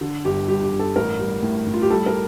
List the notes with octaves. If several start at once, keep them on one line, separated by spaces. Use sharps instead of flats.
D3
G1 G4
G2 G4
G4
G1
A4
A1 A#4
G3
A2
A2
F4
G4
G3 A4
A#4